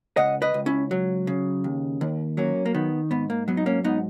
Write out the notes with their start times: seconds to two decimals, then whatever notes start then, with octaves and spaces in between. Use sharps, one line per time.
0.17 C#2 D#5 F#5
0.42 B4 D#5
0.54 C#2
0.66 C#4 E4
0.91 F#3
1.27 C#3
1.64 D#2
2.01 D#2
2.37 F#3 A#3 C#4
2.66 A#3
2.75 D#3 B3
3.11 G#2 B3
3.30 A#3
3.48 F#3 B3
3.57 D#4
3.66 A#3 C#4
3.84 G#2 B3 D#4